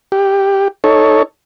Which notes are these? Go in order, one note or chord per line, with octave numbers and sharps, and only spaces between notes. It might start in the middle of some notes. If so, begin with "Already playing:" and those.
G4
D#4 A4 C#5